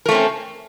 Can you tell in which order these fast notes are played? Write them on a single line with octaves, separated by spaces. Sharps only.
A#4 A3 C4 C#4